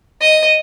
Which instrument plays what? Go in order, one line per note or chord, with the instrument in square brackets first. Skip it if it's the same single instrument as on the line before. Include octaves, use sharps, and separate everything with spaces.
[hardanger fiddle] D#5